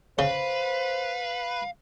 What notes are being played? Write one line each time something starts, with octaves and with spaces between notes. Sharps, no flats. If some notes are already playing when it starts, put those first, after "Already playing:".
C#3 B4 C5 F5